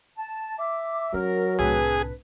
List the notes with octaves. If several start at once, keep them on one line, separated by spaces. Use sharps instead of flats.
A5
E5 D6
F#3 C#4 A#4
C2 A2 C4 D4 G#4 B4